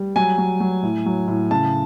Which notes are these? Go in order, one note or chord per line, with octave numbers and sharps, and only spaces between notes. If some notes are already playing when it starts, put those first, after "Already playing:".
Already playing: G3
F#3 G#5
F#3
F#3
A2
F#3
A2
C#3 A5